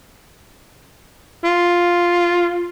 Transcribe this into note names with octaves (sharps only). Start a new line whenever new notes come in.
F4